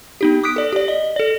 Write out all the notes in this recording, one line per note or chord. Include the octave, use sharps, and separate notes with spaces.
B3 D#4 G4
D6 D#6 F#6 B6 D7
A4 D5
G4 D5
D#5
A4 D5